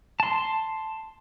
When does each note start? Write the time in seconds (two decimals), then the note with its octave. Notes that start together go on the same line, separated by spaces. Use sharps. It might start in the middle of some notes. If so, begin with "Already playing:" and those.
0.20 A5 C6